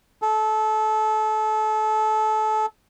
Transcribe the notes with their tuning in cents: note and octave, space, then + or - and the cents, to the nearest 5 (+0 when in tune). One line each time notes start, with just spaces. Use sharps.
A4 -25